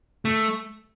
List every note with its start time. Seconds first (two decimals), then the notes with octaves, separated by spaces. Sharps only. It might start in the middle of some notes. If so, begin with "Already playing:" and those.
0.25 A3